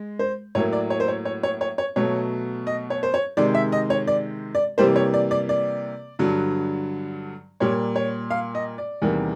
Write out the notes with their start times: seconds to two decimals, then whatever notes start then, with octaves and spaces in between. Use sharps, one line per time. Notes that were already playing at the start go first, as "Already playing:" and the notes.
Already playing: G#3
0.19 C5
0.55 A2 F#3 A#3 C#5
0.73 D5
0.90 C#5
1.00 C5
1.08 C#5
1.25 C#5
1.43 C#5
1.61 C#5
1.78 C#5
1.96 B2 F#3 A3 C#5
2.67 D#5
2.90 C#5
3.03 C5
3.14 C#5
3.37 C3 D#3 G#3 D5
3.55 E5
3.72 D#5
3.90 C#5
4.07 D5
4.55 D5
4.78 C3 E3 G3 A#3 C5
4.96 C#5
5.14 D5
5.31 D5
5.49 D5
6.19 G2 D3 F#3
7.60 A#2 G3 A#3 C#5
7.96 C#5
8.31 F5
8.55 D#5
8.78 D5
9.02 E2 C3 D#3 G3 A#3